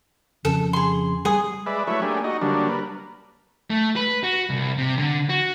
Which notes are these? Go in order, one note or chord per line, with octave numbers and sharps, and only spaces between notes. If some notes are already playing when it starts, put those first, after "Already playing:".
F2 C#3 A4
G#4 C6
G3 G#4 G#5 D#6
G#3 B4 D5 E5
F#3 A3 E4 B4 C#5 E5
A3 A#3 D4 G4 G#4
D#4 F#4 D#5
D3 F#3 G3 A#3 D4
A#4 B4
A3
B4
F#4
C2
C3
D3
F#4